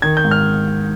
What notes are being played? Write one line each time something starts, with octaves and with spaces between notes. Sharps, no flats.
D#3 G#6
G6
G#2
F6